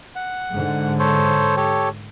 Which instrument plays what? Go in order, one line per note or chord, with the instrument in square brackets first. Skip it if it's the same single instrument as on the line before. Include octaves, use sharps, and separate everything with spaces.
[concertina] F#5
[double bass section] G#2 D3
[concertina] A4 C5 C#5
G4 A4 C#5